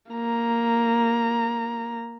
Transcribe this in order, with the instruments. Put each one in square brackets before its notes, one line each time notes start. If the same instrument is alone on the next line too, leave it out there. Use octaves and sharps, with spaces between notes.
[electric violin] A#3 A#5